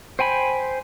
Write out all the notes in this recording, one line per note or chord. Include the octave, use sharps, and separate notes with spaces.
C5 G5 G#5 B5